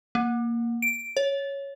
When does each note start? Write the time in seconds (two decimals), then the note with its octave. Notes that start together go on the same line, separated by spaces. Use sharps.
0.15 A#3
0.82 D7
1.17 C#5